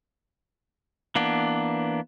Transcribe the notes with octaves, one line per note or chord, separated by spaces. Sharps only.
E3 A#3 B3 D4